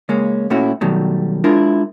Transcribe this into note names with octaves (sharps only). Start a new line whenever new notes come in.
C#3 G#3 A#3 C#4
A#2 A3 C#4 E4 F#4
B2 D#3 F#3 G3 A3
G#3 D4 E4 F4 A#4